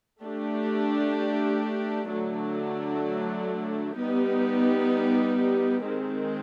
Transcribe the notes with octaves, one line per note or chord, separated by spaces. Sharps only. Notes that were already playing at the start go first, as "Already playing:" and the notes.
A3 D4 G4
D3 F#3 A3 D4
G3 B3 D#4 G4
D#3 G#3 C4